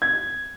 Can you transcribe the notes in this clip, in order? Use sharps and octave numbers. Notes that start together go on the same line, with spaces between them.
G#6